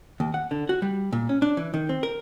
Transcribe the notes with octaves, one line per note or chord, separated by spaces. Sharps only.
D#2
F#5
D3
F#4
G3
A#2
C#4
D4
E3
D#3
C4
A#4